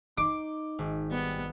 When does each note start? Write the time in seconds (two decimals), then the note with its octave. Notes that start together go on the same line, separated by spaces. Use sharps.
0.18 D#4 D6 C7
0.79 G#1
1.11 G3 B3